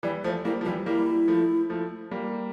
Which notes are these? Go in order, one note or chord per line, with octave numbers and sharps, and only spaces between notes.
E3 G3 D5
F3 A3 C5
G3 A#3 E4
F3
E3 G3 F4
G3 A#3 E4
F3 A3
F3 A3
G3 A#3